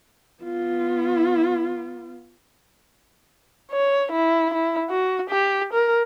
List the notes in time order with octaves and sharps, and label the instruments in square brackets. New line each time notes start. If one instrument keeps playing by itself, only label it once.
[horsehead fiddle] B3 F4
[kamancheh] C#5
E4
E4
F#4
G4
A#4